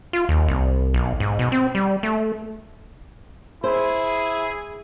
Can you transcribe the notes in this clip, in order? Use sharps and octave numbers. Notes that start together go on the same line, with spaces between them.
F4
D#2
C2
B1
G#2
B2
C4
G3
A3
E4 G#4 C5